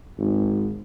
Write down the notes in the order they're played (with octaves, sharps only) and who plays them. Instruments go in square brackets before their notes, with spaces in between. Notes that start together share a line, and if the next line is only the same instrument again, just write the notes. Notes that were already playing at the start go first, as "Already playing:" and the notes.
[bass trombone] G#1